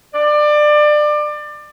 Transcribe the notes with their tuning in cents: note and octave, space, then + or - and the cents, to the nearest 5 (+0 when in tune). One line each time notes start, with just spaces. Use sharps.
D5 +25